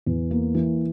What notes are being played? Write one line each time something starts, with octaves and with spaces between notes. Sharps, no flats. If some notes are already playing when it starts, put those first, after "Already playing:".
E2
A#3
E3